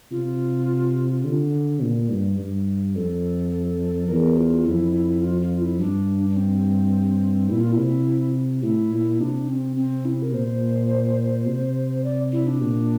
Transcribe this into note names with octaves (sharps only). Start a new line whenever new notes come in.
C3 F4
D3
A#2
G2
G2
F2 A4
E2 A#4
F4
F2 E4
F4
F4
E4
G2 D4
D4
C4
A#2 E4
F4
E4
C3
A2 E4
A#2
C3 D4
C4
C4
E4
A#4
A#2 C5
C3
D5
E4
D4
A#2